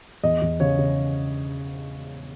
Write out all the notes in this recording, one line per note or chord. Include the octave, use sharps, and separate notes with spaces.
E2 D#5
E2
C#3 C#5
C#3